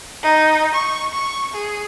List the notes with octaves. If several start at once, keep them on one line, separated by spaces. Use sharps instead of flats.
D#4
C#6
C#6
G#4